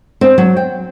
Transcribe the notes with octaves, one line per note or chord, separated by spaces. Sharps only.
C4
F#3
G5